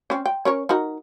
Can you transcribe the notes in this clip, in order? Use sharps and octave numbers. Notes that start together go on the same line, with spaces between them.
C4 C#4
G5
C#4 A#4 C#5
D#4 F#4 A#4